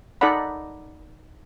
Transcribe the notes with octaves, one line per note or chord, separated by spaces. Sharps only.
D#4 A4 D5 D#5 F#5 B5